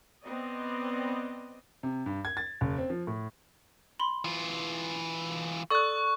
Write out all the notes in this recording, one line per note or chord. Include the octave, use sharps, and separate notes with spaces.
B3 C4 D5 D#5
C3
G2
G#6
A6
F#1
C4
F3
A2
B5 C6
E3 F4
A4 D5 C#6 D#6 F#6